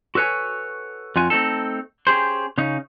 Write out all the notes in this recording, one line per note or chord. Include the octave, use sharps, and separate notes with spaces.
F#4 A4 B4 C#5 G#5
F2 F4 F#4 G#5
A3 C4 D#4 A4
C#4 G4 G#4 C5
C#3 C#4 D#4